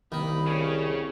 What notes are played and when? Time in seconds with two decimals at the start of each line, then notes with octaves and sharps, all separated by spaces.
0.12 C2 D#3 A#3 B5
0.47 C#3 C#5